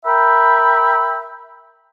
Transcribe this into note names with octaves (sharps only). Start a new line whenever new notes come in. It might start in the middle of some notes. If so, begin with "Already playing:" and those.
A#4 E5 G5 B5